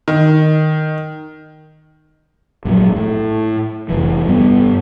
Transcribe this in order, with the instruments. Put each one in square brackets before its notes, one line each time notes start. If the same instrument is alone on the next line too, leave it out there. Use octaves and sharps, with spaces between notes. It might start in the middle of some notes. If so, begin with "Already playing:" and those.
[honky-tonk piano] D#3
[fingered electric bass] A#1 G#2 D#3 F#3
A2
F1 E3
G2 B3